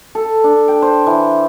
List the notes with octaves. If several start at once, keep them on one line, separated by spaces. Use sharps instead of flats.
A4
D4
G5
C5
E3